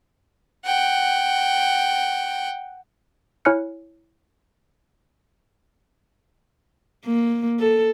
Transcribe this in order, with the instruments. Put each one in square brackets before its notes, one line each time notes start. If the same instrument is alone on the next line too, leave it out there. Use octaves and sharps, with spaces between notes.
[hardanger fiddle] F#5 G5
[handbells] E4 C#5 G#5 F6 F#6 C#7
[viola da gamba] A#3
A4